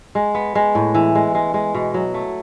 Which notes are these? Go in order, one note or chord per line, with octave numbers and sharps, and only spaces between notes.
G#3
B3
G#3
A2
E3
G#3
G#3
G#3
B2
F#3
A3